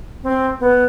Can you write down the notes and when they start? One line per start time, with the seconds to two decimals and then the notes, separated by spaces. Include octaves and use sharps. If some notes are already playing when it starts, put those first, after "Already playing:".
0.23 C4
0.60 B3